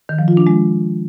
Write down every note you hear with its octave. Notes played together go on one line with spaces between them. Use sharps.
D#3
F3
F4
D4
G#3